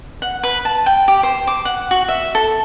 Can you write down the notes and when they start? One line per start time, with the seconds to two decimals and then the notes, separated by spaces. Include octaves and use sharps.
0.22 F#5
0.43 B4
0.65 A5
0.86 G5
1.08 G4
1.23 C5
1.47 D6
1.65 F#5
1.91 F#4
2.08 E5
2.35 A4